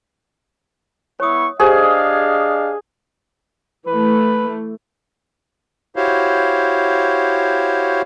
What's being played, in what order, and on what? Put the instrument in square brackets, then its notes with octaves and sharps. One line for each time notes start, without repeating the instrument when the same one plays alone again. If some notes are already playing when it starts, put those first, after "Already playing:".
[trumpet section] B3 E4 C#6 [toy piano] C#5 D#6
[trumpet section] D4 D#5 F5 [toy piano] G4 C5 [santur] G#4
[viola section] E3 A3 [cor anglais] B4
[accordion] E4 F#4 G4 C5 C#5 F5